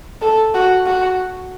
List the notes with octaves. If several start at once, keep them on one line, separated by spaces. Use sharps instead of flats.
A4
F#4
F#4